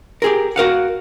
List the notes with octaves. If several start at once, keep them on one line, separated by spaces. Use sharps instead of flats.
G4 G#4 A#4
F#4 A#4 F5 F#5